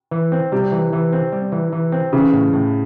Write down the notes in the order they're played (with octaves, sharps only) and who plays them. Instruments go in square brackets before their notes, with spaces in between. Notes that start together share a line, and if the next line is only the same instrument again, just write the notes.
[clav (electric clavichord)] E3
C4
[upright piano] C3 [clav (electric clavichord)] G3
[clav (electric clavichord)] E3
E3
C4
G3
E3
E3
C4
[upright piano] C#3 [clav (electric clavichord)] E3
[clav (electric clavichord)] A2
A2